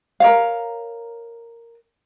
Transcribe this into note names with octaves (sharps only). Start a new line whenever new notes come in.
A#4 C#5 F5